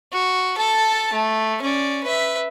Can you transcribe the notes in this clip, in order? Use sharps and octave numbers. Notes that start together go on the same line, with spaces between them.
F#4
A4 A5
A3
C#4 D5
B4 E5